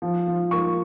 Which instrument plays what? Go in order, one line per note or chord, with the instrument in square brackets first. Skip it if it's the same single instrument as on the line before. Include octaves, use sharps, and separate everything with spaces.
[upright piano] F3
F3
A#3 C#6